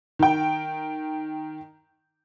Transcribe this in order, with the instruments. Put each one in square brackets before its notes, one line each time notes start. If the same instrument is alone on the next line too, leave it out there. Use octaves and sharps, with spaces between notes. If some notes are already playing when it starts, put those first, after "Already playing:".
[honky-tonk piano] D#3 G5